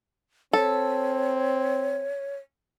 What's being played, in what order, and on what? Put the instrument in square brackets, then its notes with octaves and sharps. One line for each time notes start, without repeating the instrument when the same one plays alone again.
[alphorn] C4 [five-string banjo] A4 [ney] C#5